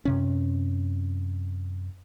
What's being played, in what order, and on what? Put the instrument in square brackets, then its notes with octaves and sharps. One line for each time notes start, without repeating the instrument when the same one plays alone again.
[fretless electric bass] F#2 C3 C#4